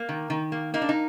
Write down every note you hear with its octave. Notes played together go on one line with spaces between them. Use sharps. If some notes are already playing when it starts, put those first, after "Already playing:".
Already playing: A#3
D#3
D#3
A#3
A#3 D#4
D4
D#4